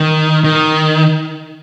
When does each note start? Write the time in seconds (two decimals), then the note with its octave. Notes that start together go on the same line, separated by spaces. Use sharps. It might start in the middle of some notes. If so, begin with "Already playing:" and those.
Already playing: D#3
0.44 D#3